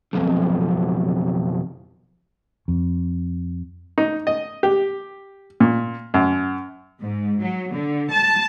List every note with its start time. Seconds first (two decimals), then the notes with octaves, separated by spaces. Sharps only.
0.13 B1 F2
2.68 F2
3.98 D#4
4.27 D#5
4.63 G4
5.60 A#2
6.14 F#2
7.00 G#2
7.40 F#3
7.71 D3
8.11 A5